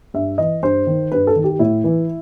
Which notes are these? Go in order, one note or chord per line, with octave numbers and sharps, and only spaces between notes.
G2 E5
E3 D#5
G2 C5
D#3
G2 B4
A4
D#3
G4
A2 E4
E3